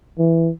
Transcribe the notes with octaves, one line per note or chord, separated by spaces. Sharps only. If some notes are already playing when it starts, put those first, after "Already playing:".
E3